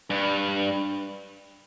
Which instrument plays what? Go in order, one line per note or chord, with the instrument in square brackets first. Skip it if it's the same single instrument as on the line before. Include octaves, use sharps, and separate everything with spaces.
[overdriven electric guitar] G2